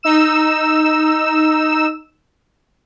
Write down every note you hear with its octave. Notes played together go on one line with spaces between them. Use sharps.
D#4 E6 E7